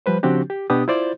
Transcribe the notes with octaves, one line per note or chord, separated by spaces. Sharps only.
F3 G3 B4 C5
C#3 F3 C4 D4 F#4 G4
G4
B2 B3 D4 G4 D#6
E4 F4 C5 D5